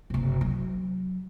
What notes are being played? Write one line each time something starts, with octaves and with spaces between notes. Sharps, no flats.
F#1 C3
F#3